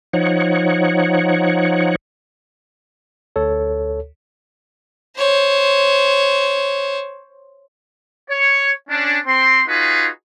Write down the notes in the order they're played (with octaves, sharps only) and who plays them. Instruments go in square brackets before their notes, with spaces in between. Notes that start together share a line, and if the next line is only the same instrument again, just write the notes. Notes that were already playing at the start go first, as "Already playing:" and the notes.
[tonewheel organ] F3 D#4 C#5 F#5
[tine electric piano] D2 A4 C#5
[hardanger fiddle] C5 C#5
[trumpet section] C#5
C#4 D4
C4 C6
D#4 F4 F#4 G#4 B4